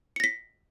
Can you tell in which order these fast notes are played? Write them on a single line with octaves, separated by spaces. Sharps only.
C#7 A#6 B6